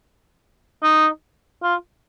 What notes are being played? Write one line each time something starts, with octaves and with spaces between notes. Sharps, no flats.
D#4
F4